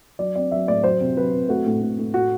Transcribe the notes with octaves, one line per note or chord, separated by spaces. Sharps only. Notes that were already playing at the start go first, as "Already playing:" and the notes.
F#3 D5
C4 D5
F#3 E5
A2 D5
F#3 C5
C3
F#3 B4
C3
A3 F#4
A2
A2
A2
A2 F#4